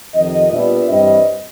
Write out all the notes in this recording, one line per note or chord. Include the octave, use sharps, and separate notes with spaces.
F2 C3 D#3 D#5
A#2 G3 B3 D4 E5
G2 E3 G3 C4 D#5